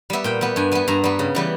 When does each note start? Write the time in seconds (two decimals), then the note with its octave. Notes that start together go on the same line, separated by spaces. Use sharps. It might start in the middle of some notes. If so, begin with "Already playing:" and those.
0.10 G3 B3 E5
0.24 A#2 G5
0.41 G3 B3
0.56 G2 G#5
0.72 G3 B3 G#5
0.88 G2 A#5
1.04 G3 B3
1.19 C#3
1.35 E3 G3 B3